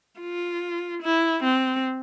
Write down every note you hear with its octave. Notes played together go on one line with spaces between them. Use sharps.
F4
E4
C4